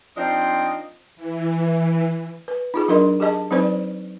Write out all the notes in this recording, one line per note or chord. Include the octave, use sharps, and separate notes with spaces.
F3 C4 D4 D#4 F4 D#5
E3
B4
D#4 F4 G#4
F#3 D4 A#4 D#5 C6
G4 G#4 D#5 A5
F#3 C4 D#4 B4 C5 D5